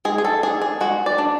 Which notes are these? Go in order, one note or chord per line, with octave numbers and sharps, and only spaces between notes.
G#3 G#4
G#4
A4
D4 G#4
G#4
G#3 F#4
D5
D4